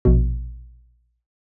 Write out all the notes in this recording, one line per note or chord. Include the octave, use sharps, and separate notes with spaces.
A#1 B2